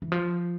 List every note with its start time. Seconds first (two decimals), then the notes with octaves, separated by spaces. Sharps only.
0.02 E3
0.12 F3